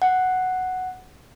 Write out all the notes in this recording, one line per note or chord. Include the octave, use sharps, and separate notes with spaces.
F#5